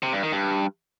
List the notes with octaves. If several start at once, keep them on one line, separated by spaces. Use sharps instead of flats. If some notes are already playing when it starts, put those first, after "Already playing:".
C3
G2
D#3
G2